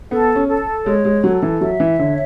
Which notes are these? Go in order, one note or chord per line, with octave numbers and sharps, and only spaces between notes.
B3 A4
C#4
A4
G#3 C#5
G#3
F#3 A4
E3
F#3 E5
E3
D3 C#5